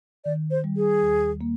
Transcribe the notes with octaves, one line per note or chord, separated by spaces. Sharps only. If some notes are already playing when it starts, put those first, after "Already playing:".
D#3 D5
C5
G3
G#4
D#2
A#3